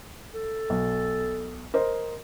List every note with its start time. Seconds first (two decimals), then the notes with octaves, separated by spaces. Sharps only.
0.34 A4
0.70 B1
1.74 A#4 C5 D#5